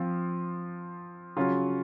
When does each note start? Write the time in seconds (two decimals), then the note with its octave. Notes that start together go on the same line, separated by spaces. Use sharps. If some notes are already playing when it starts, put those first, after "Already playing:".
Already playing: F3 C4 F4
1.36 C#3 F#3 C#4 F4